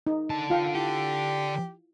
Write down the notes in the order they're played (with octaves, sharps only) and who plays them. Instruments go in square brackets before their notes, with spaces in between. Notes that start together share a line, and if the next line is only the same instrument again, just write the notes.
[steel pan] D#4
[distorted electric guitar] D3 A5
[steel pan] F4 F5 G5
[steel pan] E4 [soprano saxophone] G4